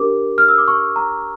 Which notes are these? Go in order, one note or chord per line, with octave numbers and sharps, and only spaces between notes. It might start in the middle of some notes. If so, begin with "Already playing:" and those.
Already playing: D4 G4 A#4 D6
F6
E6
D6
C#6
A#5